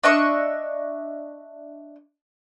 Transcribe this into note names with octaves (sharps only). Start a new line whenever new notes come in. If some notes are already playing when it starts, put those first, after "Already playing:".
D4 D#5 E5 C#6